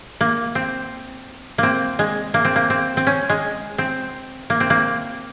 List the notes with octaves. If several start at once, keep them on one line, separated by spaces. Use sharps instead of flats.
A#3
C4
A#3 C4
G#3
A#3
C4
A#3
C4
C4
C#4
G#3
C4
A#3
C4
A#3